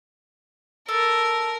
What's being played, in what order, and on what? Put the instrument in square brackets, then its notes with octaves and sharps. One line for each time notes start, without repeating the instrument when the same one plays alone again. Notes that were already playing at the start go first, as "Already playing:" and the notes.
[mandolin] A4 [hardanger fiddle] A#4